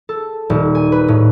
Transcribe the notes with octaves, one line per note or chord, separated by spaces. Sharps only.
A4
D#1
G#5
B4
A2